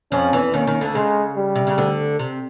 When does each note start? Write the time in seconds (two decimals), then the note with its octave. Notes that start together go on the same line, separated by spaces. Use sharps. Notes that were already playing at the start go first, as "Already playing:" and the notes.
0.12 F2 F3 C#4
0.33 E2 E3
0.53 D#2 D#3 C#4
0.67 D#2 D#3
0.81 D2 D3
0.95 C#3 G#3
1.36 G3
1.56 C3
1.67 C#3
1.78 D2 D3
2.19 C3